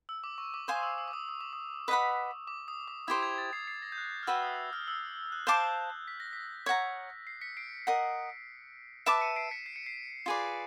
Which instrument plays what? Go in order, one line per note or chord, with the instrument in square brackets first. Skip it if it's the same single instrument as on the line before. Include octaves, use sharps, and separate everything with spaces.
[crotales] E6
D6
C#6
D6
[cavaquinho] C5 F5 G#5 C6 [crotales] D#6
[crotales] E6
E6
D6
D#6
D#6
D6
D#6
[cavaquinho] B4 D#5 F#5 B5
[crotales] D6
D#6
D6
[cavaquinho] E4 G4 C5 [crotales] D#6
[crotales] G#6
A6
C7
C7
A#6
G6
F#6
F6
[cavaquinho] F#4 B4 E5 G5 [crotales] E6
[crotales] D#6
F6
E6
F#6
[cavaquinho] C5 F5 A5 D6 [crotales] G6
[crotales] B6
A#6
B6
[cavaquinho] C#5 F#5 A#5
[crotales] C7
B6 C#7
C7 D7
[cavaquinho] A#4 D#5 F#5
[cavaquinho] B4 E5 A5 D6 [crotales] D7 E7
[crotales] C#7 D#7
C7 D7
B6 C#7
C7
C#7
C7
[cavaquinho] F4 G#4 B4 D5